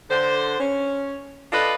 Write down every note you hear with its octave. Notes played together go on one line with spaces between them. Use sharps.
D3 C5
C#4
D4 F4 A4 B4 D5 D#5